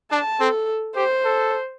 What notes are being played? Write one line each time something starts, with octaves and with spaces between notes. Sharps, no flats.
D4 A5
C4 A4
G4 C5
A4